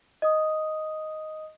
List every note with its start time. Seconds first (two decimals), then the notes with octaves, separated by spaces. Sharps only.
0.22 D#5 D#6